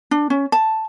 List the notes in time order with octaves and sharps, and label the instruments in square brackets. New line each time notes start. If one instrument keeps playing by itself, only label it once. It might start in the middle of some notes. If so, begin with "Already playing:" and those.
[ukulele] D4
C#4
A5